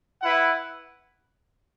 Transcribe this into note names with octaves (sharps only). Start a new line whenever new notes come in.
E4 B4 F#5